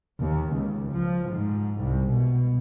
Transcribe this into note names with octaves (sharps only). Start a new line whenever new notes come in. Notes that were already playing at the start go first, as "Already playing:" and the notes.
D#2
C#2
F3
G#2
C2
B2